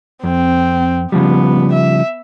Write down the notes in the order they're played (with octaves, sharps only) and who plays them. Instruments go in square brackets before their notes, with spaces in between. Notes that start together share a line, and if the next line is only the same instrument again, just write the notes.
[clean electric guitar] F2 [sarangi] C4
[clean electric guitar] C#3 F3 G3 [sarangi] B3
[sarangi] E5